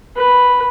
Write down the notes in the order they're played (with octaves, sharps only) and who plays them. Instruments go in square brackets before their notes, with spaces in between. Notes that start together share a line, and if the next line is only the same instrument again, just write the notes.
[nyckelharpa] B4